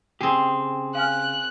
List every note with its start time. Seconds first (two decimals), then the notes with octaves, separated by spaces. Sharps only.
0.21 C#3 C4 G4 G#4
0.95 F5 G#5 F6 F#6